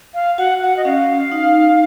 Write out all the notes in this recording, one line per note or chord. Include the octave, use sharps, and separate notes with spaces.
F5
F#4 F#5
F#5
D#5
C#4 F5
D#4